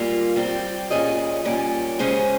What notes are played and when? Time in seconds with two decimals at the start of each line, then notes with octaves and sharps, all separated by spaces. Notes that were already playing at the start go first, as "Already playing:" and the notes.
Already playing: A#2 G3 A#3 F4
0.36 G3 C4 G4
0.91 A#2 G3 C#4 G#4 D#5
1.45 A#2 G3 C#4 G4
1.99 C#3 G#3 C#4 G#4 C5